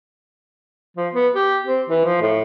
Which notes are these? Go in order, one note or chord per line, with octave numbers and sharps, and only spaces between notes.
F3
B3
G4
C4
E3
F3
A2